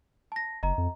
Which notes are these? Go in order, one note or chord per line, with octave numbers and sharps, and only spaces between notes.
A5 A#6
F#1 D#5 A#5
F2